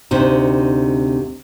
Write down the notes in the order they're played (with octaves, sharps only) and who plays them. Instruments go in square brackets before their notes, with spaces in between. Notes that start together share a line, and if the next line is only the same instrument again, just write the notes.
[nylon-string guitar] D2 C3 D#4